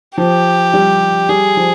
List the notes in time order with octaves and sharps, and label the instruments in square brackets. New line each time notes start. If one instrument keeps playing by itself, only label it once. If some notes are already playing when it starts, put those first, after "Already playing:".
[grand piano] F3 [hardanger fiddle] G4
[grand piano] G3
[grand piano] G3 [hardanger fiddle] G#4
[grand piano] F3